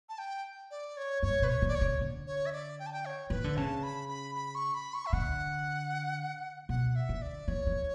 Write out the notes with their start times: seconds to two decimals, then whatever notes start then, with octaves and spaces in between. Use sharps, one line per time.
0.09 A5
0.19 G5
0.71 D5
0.97 C#5
1.23 G2 C#5
1.42 B2 B4
1.49 C#5
1.62 D3
1.68 D5
1.75 C#5
1.81 C#3
2.01 D3
2.27 C#5
2.46 E5
2.53 D5
2.80 G5
2.86 A5
2.93 G5
3.06 C#5
3.30 E3 B4
3.44 D3
3.57 C#3 A5
3.83 B5
4.09 B5
4.35 B5
4.55 C#6
4.74 B5
4.94 C#6
5.06 E5
5.13 D3 F#5
6.69 B2 F#5
6.96 E5
7.09 D3
7.22 D5
7.48 E3 C#5
7.67 E3